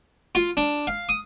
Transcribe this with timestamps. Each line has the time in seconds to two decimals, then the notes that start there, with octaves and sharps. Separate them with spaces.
0.35 F4
0.57 D4
0.87 F5
1.09 D#6